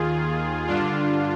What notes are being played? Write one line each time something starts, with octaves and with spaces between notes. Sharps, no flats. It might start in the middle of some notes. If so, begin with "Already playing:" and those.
Already playing: D#2 D#3 F4 G#4
G2 D3 D4 F4